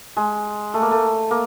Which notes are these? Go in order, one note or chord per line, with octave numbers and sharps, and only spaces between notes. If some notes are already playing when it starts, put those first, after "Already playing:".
G#3
A3
A#3
A3
A#3